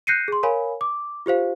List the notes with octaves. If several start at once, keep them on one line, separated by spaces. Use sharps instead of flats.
F#6 G6 A#6 C7 C#7 D#7
G#4 C6
A#4 C#5 F5 G#5 B5
D6
F4 G4 C5 F5